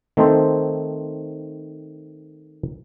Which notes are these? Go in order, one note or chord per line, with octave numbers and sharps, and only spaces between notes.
D#3 A3 C4 D#4 A4 C5